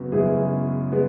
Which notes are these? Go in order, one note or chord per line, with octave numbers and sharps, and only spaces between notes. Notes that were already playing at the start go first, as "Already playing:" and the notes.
Already playing: F#2 C#3 B3 F#4
F#2 C#3 G#3 B3 E4 G#4
G#3 B3